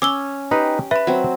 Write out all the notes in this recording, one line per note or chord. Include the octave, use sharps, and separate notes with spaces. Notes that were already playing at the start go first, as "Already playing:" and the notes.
C#4 D6 E6 G7
D#4 G4 B4
B4 E5 B5
F#3 C4